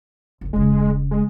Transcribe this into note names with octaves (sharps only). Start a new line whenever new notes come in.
G#1 D2
E1 C#3 G#3
G#3